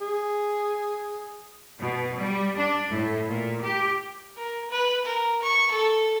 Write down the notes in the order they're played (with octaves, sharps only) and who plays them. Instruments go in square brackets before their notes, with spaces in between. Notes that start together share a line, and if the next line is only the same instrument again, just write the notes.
[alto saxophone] G#4
[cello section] B2
G3
D4
A2
A#2
G4
[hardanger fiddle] A#4
B4
A#4
C#6
A4